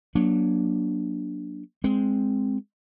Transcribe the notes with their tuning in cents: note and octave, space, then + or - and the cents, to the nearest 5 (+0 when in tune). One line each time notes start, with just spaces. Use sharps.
F#3 +0 A#3 +35 D4 +0
G#3 +0 C4 +0